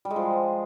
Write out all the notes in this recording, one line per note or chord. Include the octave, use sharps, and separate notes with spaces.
G3
G#3
F3